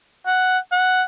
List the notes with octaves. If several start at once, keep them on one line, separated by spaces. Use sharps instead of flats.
F#5
F#5